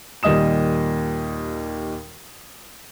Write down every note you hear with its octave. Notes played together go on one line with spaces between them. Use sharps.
D#2 A#2 G3 D#5 D#6 E7